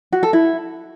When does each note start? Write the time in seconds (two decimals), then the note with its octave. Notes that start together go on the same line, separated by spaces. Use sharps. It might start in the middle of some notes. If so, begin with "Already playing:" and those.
0.12 F#4
0.23 A4
0.33 E4